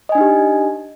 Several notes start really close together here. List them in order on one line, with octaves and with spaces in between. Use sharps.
D#5 G#5 D4 D#4 G4